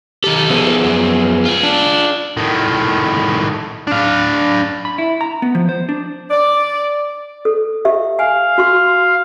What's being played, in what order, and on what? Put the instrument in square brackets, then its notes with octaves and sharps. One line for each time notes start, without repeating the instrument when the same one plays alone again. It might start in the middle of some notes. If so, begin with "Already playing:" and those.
[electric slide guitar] D#3 G4 [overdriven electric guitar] D#4 A4
[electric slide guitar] F3 B3 G#4
[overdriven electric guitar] F#2
F4 G#4
[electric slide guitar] D4
[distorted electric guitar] A2 D#3
D4 F5
[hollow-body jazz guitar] B5
E4
A#5
B3
F3
C5
D4
[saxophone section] D5
[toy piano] A4
G4 E5 F5
[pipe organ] F5 [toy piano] G#5
[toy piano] F#4 C6 C#6